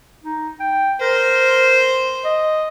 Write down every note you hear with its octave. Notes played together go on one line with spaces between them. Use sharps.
D#4
G5
A#4 C5
D#5